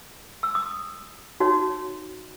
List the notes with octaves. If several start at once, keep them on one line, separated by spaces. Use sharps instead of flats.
E6
D#6
D#4 F#4 C#5